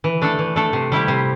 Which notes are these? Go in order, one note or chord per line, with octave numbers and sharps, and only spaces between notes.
E3
A3 D4 A4
E3
A3 D4 A4
C3
G3 E4 G4
C3